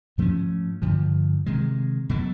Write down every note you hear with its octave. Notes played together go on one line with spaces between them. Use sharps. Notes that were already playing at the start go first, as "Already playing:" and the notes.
G#2 F3 A3 C#4
G2 D3 F3
C3 D#3 G#3
B2 F#3 A3